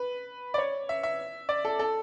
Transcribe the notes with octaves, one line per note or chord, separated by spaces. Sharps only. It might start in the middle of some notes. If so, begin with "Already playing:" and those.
Already playing: B4
D5
C#5
E5
E5
D5
A4
A4